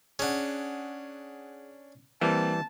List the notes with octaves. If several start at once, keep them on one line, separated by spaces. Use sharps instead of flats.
C#4 D4 G#4 F#5
E3 G3 A#3 C4 A5